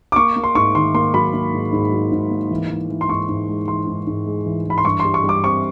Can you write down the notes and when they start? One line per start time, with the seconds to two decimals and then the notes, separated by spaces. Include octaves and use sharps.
0.12 D6
0.16 A#3 C#6
0.36 A#3
0.44 C6
0.55 G#2 C#6
0.75 D#3 C6
0.94 A#3 C6
1.14 F#3 B5
1.34 A#3
1.53 G#2
1.73 G#2
1.92 F#3
2.12 G#2
2.31 A#3
2.51 E3
2.70 E3
2.90 E3
3.01 C6
3.09 G#2 C#6
3.29 G#2
3.48 G#3
3.68 E3 C6
3.87 G#2
4.07 G#2
4.27 G#3
4.46 E3
4.65 E3 B5
4.78 C6
4.85 G2 C#6
5.00 C6
5.05 G3
5.14 C#6
5.24 G3
5.29 D6
5.44 C4 C#6